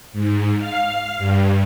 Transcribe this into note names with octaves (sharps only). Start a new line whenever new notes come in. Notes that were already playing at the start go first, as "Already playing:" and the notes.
G#2
F5
G2